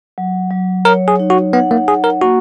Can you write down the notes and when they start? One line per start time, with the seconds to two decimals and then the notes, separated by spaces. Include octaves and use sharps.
0.18 F#3
0.51 F#3
0.85 A#4 C#5
1.08 G#4
1.19 D#4
1.30 F#4
1.53 B3 F#5
1.71 A#3
1.88 G#4 F#5
2.04 A#4
2.21 A#3 F#4